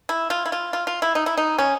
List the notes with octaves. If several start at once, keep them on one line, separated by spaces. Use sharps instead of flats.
E4
F4
E4
F4
F4
F4
E4
D#4
E4
D#4
C#4